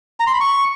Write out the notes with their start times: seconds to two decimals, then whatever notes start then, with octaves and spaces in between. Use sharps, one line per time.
0.20 A#5
0.27 C6
0.34 B5
0.40 C#6